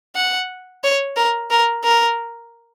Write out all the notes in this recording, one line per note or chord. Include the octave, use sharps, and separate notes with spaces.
F#5
C#5
A#4
A#4
A#4